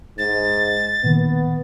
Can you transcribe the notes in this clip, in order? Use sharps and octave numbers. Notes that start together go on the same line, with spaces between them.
G#2 A6
A#2 D#3 B3